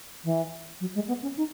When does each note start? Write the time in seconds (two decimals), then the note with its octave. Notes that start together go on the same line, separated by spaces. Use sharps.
0.24 E3
0.81 F#3
0.95 G#3
1.08 B3
1.22 C#4
1.37 D#4